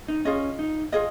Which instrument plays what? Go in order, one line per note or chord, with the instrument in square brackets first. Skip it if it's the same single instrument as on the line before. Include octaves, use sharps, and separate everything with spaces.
[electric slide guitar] D#4
[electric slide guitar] C#4 [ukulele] F4 G#4 D#5
[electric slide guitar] D#4
[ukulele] F4 G#4 D#5